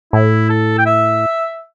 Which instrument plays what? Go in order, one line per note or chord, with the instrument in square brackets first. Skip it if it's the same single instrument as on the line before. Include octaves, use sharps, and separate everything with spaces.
[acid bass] A2 [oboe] E4
[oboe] A4
G5
E5